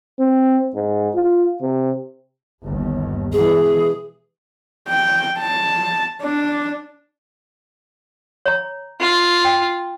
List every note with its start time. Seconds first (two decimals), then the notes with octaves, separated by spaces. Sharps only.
0.19 C4
0.75 G#2
1.15 F4
1.62 C3
2.61 G1 D#2
3.33 B2 E3 G#3 G#4
4.89 G5
5.39 A5
6.22 D4
8.46 C#5 A#5
9.00 F4
9.45 G5